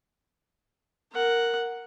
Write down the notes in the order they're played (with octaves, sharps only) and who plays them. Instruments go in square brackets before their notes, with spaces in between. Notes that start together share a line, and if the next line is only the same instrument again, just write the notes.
[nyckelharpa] A#4 F#5